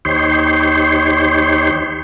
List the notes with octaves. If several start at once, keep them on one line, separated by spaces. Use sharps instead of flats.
D#2 D#4 G4 C5 C#5 C6